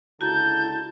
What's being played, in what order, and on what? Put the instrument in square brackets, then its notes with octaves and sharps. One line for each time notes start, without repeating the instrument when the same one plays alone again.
[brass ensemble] C#2 D3 A5 [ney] E4 [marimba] F#4 A#5 [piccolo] G6